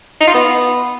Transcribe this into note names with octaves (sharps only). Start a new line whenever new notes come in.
D#4
F4
B3